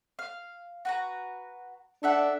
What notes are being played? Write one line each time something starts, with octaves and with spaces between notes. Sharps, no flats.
F5
F#4 B4 A#5
D4 A4 E5 F#5